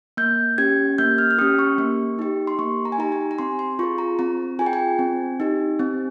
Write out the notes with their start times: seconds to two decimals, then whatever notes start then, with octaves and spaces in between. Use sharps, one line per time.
0.17 A#3 G6
0.58 C#4 G4 G#6
0.98 A#3 G6
1.18 F6
1.31 F6
1.38 C#4 G4 D#6
1.59 C#6
1.78 A#3
2.19 D#4 G4
2.47 C6
2.59 A#3 C#6
2.85 A#5
2.92 G#5
2.98 D#4 G4 A#5
3.12 G#5
3.31 A#5
3.39 C4 C6
3.59 C6
3.79 F4 G#4 C#6
3.98 A#5
4.19 C4 A#5
4.59 F4 G#4 G#5
4.66 G5
4.73 G#5
4.99 C4
5.40 D#4 G4
5.79 C4